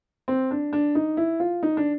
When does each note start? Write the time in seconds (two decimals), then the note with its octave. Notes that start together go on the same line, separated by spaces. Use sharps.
0.28 C4
0.51 D4
0.73 D4
0.95 D#4
1.17 E4
1.40 F4
1.63 D#4
1.77 D4